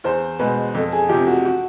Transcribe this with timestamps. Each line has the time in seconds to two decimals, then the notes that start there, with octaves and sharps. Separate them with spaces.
0.04 E2 C5
0.39 B2 G#3 B4
0.75 F2 A4
0.92 G#4
1.09 C3 F3 G4
1.27 F#4
1.45 F#4